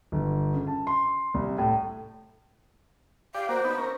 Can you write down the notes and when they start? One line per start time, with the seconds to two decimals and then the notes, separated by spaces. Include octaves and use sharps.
0.12 G1
0.54 C#3
0.67 A5
0.87 C6
1.34 C2
1.58 A2
3.35 G4 D5 F5
3.49 A#3 F#4 C5 D5
3.64 B3 D#4
3.78 C#4 A#4